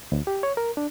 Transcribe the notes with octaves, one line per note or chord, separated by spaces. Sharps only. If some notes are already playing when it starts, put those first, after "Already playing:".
D2
G4
C#5
A#4
D4